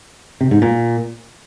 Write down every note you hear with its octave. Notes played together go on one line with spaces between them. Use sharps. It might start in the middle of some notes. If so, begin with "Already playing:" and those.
C3
G#2
A#2